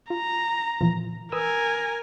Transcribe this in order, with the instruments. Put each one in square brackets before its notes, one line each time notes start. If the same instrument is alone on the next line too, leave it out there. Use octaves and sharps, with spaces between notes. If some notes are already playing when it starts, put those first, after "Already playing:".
[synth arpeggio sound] F4 [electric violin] A#5
[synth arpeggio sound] A#2 E3 F3
[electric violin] A#4 G#5 [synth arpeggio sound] B4 D#6 E6